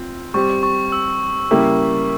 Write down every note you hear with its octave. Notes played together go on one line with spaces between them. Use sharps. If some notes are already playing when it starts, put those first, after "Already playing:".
Already playing: C4 F4
G3 C4 G4 C#6
C#6
E6
C#3 G3 A#3 E4 G4